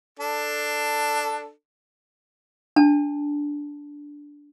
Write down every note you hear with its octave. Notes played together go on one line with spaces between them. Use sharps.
D4 A4
D4 A5